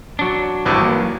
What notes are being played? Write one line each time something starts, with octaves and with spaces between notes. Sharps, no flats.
F#3 D4
G#1 G2 E3
A#3